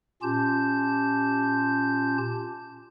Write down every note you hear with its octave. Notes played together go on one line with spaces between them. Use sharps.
A#2 C#4 F4 G4 A5 G6